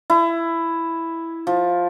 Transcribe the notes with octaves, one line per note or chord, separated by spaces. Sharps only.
E4
F3